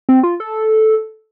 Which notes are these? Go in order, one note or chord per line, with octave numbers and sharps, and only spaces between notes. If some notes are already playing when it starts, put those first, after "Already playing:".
C4
F4
A4